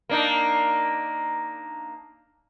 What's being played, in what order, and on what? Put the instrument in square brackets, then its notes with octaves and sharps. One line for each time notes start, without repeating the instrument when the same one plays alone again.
[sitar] A#3 D4 D#4